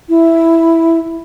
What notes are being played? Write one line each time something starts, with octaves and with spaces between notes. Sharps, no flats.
E4